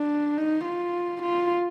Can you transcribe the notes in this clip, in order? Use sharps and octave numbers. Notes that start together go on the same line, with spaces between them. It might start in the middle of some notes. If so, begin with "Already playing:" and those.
Already playing: D4
D#4
F4
F4